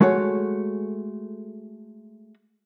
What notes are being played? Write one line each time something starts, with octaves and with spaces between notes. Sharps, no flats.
G#3 A3 F#4 A4 C#5